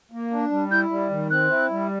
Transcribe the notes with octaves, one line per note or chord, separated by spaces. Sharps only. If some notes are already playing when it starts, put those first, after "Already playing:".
A#3
D4
G3
E4 G6
G3
D#3
C4 F#6
E4
G3